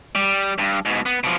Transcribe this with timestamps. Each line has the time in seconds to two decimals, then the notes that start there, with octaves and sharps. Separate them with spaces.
0.15 G3
0.58 G2
0.85 G#2 B2
1.06 B3
1.24 B2 F3